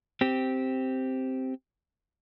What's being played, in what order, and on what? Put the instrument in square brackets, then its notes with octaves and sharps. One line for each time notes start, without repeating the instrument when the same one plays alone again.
[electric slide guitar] C4 G4